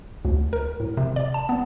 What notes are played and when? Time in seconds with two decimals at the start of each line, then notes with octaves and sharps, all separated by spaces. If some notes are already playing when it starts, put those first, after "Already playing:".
0.25 D2
0.53 A#4
0.80 A2
0.97 C3
1.16 D5
1.34 A5
1.49 B3